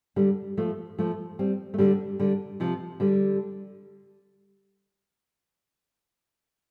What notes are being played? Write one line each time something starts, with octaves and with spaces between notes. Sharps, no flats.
D3 G3
F3 A3
F3 A3
G3 C4
A3
D3 G3
D3 G3
C3 F3
D3 G3